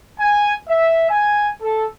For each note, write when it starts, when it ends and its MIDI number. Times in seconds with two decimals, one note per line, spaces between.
0.20 0.54 80
0.68 1.08 76
1.10 1.51 80
1.63 1.85 69